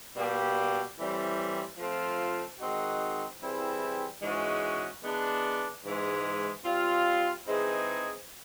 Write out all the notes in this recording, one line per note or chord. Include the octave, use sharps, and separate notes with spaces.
B2 G3 A#3 D4 G4
A2 E3 G3 C4
F3 A3 C4 F4
D#3 G#3 C4 D#4 F#4
E3 G3 C4 E4 G#4
G#2 E3 G#3 C#4 F#4
E3 G#3 B3 D4
G#2 E3 G#3
G3 C4 F4
E3 G#3 C4 D#4 G#4